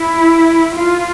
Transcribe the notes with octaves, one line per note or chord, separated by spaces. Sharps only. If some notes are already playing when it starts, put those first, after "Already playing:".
Already playing: E4
F4